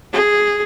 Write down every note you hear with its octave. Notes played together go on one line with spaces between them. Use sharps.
G#4